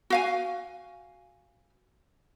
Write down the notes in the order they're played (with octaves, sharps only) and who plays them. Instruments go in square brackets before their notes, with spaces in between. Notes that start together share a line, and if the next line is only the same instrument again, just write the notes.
[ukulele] F#4 F5 G#5